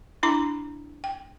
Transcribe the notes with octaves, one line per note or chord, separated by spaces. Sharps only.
D4 E4 A#5 B5 D6
G5